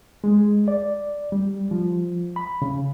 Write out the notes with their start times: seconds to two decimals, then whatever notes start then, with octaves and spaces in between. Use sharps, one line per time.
0.24 G#3
0.68 D5
1.32 G3
1.71 F3
2.36 B5
2.62 C#3